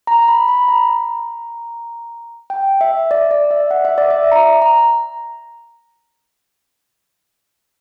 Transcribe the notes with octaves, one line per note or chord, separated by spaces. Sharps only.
A#5
B5
B5
A#5
G5
E5
D5
D5
E5
F#5
E5
D5
E5
A#5
A#5